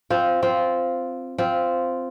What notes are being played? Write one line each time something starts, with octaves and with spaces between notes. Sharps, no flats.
C4 F4
C4 F4
C4 F4